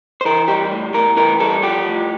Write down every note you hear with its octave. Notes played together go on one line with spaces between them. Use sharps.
C5
E3 A#4
G3 G4
A2
A2 A#4
E3 A#4
G3 A4
F3 G4
A2